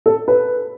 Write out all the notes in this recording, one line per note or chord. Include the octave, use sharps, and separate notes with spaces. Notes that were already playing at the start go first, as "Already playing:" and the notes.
A4
B4